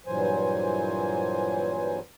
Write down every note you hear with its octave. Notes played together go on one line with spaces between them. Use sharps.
G2 A#2 E3 F#3 C5 G#5